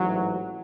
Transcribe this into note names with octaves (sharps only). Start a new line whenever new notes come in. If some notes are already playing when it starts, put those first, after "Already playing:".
Already playing: A1 G#2 E3 F#3